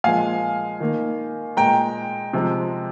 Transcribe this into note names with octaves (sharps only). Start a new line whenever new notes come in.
A#2 F3 G#3 F5 G#5
D#3 A#3
A#2 G#3 G5 A#5
C3 F3 G#3